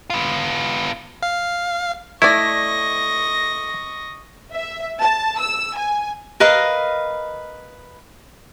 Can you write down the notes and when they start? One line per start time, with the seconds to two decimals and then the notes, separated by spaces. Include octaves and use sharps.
0.10 B3 F4
1.23 F5
2.22 A3 E4 D5 D#5 C#6 A#6
4.53 E5
5.00 A5
5.40 E6
5.76 G#5
6.40 A#4 B4 D#5 F5